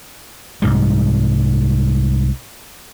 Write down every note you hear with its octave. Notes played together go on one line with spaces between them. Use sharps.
C2 G#2 G3